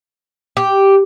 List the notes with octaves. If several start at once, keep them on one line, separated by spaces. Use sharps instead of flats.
G4